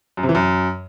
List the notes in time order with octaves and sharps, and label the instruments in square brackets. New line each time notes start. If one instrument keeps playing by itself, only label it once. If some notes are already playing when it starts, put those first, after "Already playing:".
[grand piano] F#2
C3
E3
F#2